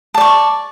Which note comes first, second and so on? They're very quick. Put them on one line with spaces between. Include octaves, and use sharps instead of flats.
A5 D5 C#6